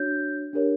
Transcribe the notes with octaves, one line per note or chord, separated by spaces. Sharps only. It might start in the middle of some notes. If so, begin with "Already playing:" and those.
Already playing: D4 F#4 C#5 G6
D4 G4 A#4 C#5